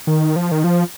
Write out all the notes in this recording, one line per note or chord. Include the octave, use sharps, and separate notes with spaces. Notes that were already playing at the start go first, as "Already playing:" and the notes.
D#3
F3
D#3
F3